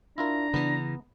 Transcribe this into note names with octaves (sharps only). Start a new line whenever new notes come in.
D4 E4 F4 A#4 A#5
C#3 E3 B3